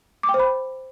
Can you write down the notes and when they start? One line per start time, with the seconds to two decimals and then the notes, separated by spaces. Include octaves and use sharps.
0.23 D6
0.29 G5
0.34 C5
0.39 B5